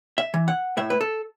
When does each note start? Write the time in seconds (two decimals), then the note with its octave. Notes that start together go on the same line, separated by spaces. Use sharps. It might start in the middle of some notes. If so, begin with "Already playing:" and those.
0.18 E5
0.34 E3
0.48 F#5
0.77 A2 E5
0.90 B4
1.01 A4